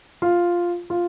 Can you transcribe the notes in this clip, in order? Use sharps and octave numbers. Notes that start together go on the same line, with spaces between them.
F4
F4